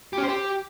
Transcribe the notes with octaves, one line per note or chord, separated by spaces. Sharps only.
G4
C#4
C5
G4